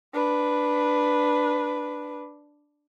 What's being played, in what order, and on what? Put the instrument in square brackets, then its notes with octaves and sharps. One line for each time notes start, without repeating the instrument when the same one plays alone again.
[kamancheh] D4 B4